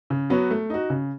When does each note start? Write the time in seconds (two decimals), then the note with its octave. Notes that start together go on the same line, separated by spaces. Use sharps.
0.10 C#3
0.30 F#3 B3 F#4 C#5
0.51 A3
0.70 D#4 F#4
0.90 C#3